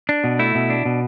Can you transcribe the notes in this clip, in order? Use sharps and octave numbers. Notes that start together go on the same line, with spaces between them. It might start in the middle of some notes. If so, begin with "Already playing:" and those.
D4
B2
A3 E4
B2
D4
B2